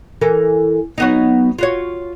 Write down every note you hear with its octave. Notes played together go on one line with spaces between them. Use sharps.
E3 A4 A#4
F#3 B3 D#4
F4 F#4 C#5